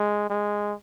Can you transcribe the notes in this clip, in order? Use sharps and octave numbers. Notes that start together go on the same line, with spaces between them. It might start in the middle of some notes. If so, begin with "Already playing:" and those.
Already playing: G#3
G#3